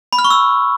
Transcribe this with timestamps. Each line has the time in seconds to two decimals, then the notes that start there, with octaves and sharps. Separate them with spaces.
0.13 B5
0.19 F6
0.25 C#6
0.30 E6